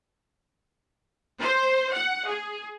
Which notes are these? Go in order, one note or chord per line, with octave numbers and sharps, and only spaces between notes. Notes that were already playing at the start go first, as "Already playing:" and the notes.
C5
F#5
G#4